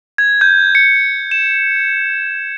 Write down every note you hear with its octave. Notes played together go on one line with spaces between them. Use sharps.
G#6
G6
C#7
E7